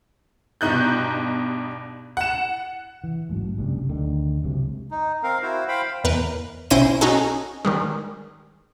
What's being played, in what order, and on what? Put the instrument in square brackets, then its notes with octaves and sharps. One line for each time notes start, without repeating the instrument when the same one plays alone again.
[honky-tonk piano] G2 B2 D#4 F#6 G6
F#5 E7
[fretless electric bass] E3
A1 G#2 F#3
F#1 C2 G2
D2 D3 D#3
C#2 F#2 C3
[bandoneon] D#4
C4 A#4 F5
E4 F#4 C5
C5 F5 G5 B5
[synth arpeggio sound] E2 A#4 B4
B1 C#4 E4 C5 A#6 D#7
C#4 D#4 F#4 G#4 A4
D#3 G3 G#3